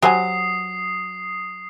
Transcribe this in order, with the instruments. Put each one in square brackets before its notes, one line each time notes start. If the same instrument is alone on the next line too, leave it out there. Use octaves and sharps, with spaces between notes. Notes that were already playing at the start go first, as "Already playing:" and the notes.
[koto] F#3 [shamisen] G4 C5 G#5 [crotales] D#6 C7